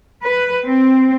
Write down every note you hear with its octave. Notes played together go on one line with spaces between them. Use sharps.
B4
C4